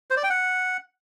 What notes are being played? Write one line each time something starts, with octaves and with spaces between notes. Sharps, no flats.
C5
D5
G5
F#5